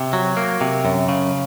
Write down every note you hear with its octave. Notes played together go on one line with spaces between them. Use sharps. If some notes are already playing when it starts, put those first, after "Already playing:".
Already playing: C3
F#3
A#3
C3
F#2
C#3